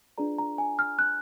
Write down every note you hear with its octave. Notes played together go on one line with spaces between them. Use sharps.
D4 F4 G#4 B4 D5 A#5
A#5
G#5
F6
F#6